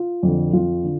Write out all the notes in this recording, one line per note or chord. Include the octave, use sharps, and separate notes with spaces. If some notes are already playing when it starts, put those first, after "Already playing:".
Already playing: F4
F2 D3
F2 F4
D3